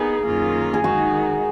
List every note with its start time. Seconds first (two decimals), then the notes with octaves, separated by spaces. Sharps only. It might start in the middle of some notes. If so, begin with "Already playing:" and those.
Already playing: B3 D#4 G#4 A#4
0.25 F#2 D#3 A#3 C#4 F4
0.74 G#4
0.84 D#3 G#3 D#4 F#4